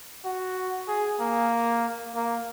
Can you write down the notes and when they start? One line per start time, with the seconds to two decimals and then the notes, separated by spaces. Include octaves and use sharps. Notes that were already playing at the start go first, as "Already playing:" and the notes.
0.25 F#4
0.88 G#4
1.20 A#3
2.15 A#3